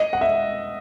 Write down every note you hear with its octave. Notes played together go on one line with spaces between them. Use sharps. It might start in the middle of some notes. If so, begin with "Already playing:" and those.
Already playing: D#5
F#5
E5